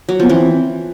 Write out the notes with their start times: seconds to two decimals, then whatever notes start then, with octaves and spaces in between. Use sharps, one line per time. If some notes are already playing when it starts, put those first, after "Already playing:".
0.09 F#3
0.20 F3 B3
0.30 E3 C4